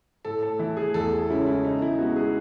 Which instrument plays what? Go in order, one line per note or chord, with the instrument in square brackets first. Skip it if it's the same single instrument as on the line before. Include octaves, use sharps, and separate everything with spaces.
[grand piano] A2 A4
A4
E3 A3 E4
G#4
E2 A4
G#4
C#3 G#3 C#4 E4
E4
C#3 D#4
E4
G#3 B3 F#4
G#4